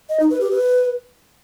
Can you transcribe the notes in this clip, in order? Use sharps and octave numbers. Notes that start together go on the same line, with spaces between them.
D#5
D#4
B4
G4
B4